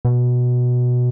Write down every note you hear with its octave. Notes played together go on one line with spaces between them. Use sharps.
B2